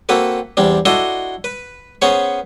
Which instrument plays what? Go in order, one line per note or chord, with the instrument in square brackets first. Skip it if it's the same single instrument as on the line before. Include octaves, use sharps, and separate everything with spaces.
[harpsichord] A#3 C4 F#4 A4 B4
E2 G3 C4 D4
D4 E4 F#4 A4 D#5 C6
B4
B3 C#4 G#4 C5 C#5 C#6